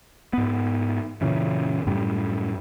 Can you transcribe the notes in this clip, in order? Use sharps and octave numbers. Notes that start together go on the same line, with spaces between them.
G#2 B3
F#2 A#2 C#3 E3
F#2 A2 G3